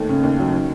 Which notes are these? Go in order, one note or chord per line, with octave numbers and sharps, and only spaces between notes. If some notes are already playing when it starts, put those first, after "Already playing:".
Already playing: D#2 A3
C#3
D#2
F#3
D#3